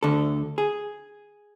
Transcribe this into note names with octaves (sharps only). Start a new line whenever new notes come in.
D2 D3 A4
G#4